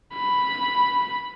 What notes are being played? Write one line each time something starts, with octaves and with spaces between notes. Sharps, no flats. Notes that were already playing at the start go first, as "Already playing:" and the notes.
B5